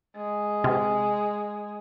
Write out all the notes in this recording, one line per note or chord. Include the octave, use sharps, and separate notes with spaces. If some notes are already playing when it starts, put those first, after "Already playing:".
G#3
C3